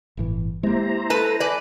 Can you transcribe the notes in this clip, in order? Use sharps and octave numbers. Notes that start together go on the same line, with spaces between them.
G1 A2 E3
G#3 A#3 E4 G4 C5 A#5
A4 B4 A5
B4 D5 G#5